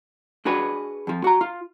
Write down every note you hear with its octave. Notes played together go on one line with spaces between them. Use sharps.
D4 F#4 G#4 B4
F2 F3
F#4 A#5
F4